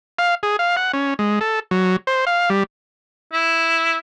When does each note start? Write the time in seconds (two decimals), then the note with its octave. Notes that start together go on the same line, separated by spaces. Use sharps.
0.19 F5
0.43 G#4
0.59 F5
0.77 F#5
0.93 C#4
1.19 G#3
1.41 A4
1.71 F#3
2.07 C5
2.27 F5
2.50 G3
3.32 E4